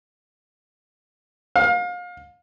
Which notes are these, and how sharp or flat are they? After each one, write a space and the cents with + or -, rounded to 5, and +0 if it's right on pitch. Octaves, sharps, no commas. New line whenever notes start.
F5 +30